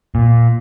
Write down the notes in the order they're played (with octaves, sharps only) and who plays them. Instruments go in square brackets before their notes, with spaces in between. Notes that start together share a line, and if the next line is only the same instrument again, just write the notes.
[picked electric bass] A#2